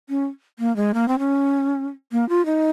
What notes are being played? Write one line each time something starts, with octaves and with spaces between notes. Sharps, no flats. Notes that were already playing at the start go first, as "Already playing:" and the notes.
C#4
A#3
G#3
A#3
C4
C#4
A#3
F4
D#4